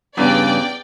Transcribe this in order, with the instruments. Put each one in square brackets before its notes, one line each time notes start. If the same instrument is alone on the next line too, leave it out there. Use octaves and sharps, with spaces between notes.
[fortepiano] E2 [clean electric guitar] G2 C#3 [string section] D5 G5